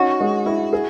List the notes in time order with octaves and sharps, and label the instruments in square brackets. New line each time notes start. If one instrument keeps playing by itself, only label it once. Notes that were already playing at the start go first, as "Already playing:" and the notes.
Already playing: [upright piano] C#4 D#4 [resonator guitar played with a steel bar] F#4
[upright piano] G#3
E4
G#4